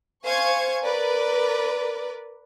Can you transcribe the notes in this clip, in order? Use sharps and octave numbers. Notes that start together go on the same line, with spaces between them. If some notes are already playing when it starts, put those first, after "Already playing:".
C5 F5 G#5 C#6 G#6
A#4 B4 D5